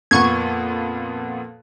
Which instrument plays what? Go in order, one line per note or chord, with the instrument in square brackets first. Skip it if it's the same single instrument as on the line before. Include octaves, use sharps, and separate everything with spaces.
[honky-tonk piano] F2 A#2 B3 [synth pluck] C#6 G#6